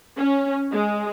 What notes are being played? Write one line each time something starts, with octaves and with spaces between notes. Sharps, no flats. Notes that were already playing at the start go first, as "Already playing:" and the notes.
C#4
G#3